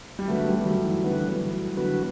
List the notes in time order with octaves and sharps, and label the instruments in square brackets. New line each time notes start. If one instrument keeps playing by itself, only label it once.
[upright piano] G3
[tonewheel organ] D3 F#3 B3 F#4 B4 [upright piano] A3
[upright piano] G3
G3
F#3
E3
[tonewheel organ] D3 F#3 B3 F#4 B4 [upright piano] E3
[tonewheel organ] D3 F#3 B3 F#4 B4